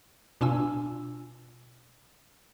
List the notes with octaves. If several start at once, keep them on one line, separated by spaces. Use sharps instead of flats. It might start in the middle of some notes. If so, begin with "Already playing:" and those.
B2 D4 F4 G#5 E6